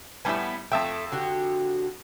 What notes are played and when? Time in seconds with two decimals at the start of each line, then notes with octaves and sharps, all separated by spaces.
0.25 A2 G3 B3 E4 G#5
0.72 F2 A3 E5 G5
1.12 D3 F#4 G4